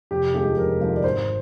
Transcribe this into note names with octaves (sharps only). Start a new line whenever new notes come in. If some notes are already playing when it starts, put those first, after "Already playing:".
F1 G4
D#2 D3 F3 G#3 G4
F1 A#4
D#2 D3 F3 G#3
D5
G#1 C5